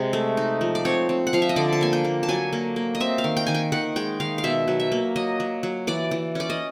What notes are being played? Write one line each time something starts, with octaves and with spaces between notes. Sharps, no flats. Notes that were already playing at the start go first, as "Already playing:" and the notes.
Already playing: C3 G#3
A3
D#4
F3
D5
C4 C#5
C4
F#5
F3 F5
E5
D#5
D3 D5
A5
A#3 G#5
G5
A#3
A5
F#3 G#5
A#3
A#3
D#5
C4 E5
F5
D#3
G5
D#3 G#5
G5
D#3 F#5
G#3 G5
D#3 F5
F5
B2 E5
F#3
E5
A#3
F#3 D#5
F#3
F#3
E3 D5
E3
C#4 D5
D#5